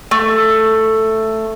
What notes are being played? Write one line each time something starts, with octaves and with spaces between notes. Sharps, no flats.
A3